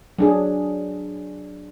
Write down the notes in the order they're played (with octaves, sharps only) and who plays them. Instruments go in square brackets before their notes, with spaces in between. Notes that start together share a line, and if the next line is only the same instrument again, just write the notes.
[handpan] F#3 D4 G#4